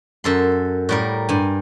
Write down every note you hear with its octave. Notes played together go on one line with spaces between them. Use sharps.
F#2 A4 C6
A2 G3 A#4
G2 G#5